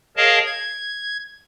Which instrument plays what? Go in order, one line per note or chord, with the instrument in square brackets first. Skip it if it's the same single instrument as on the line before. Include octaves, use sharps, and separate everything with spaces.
[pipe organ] G#4 A#4 C#5 D#5 F5 A5
G#6